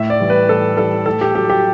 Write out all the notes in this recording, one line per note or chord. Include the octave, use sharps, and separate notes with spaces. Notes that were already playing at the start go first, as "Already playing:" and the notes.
Already playing: A2 E5
D5
E3 G3
B4
A2 A4
E3 G3 A4
A2 A4
G4
F#3 G4
G4